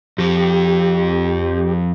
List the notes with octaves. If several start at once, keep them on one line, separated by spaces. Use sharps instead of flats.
F2 F3 G4